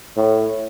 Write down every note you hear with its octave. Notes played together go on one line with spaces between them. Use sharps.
A2